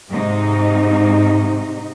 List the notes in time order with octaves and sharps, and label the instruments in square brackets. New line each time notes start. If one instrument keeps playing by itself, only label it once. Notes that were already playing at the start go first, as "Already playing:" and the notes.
[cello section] G#2 C3 D#4